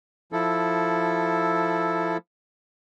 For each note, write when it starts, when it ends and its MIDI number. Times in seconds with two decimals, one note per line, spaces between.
0.32 2.17 53
0.32 2.17 64
0.32 2.17 69